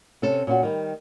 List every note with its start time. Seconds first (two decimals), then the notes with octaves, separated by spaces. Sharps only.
0.22 C3 C#4 A4
0.47 A#2 C#4 F4 F#4
0.63 D#3 G3